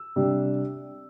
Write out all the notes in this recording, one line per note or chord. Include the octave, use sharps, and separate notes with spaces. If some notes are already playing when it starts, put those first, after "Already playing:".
Already playing: E6
C3 G3 D4